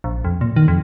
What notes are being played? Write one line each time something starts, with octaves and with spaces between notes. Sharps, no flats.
A#1
F2
A#2
D#3
F2